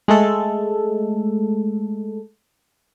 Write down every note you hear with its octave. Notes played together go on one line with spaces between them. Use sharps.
G#3 A3 A4